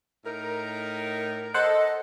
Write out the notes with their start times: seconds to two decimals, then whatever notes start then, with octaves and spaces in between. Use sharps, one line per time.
0.25 A2 D#4 A#4
1.54 A4 C5 D#5 F#5